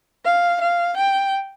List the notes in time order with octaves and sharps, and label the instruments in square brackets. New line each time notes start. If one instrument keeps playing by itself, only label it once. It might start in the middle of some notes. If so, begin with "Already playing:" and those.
[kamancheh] F5
F5
G5